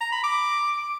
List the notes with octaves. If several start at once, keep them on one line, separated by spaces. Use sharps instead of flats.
A#5
B5
D6